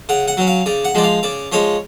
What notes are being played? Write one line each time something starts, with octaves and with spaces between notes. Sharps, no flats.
C#3 F#5
F#5
F#3 C#4
F5
C#3 D5
F#5
F3 G#3 D5
F5
C#3 D5
F3 G#3 C#5